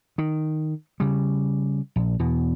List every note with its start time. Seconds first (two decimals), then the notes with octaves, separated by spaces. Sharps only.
0.18 D#3
1.00 C#3 G3
1.96 A#1
2.19 E2 B2